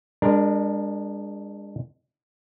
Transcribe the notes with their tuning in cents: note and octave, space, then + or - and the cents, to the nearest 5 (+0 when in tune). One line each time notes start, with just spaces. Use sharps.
G#3 -35 D4 +0 A#4 +0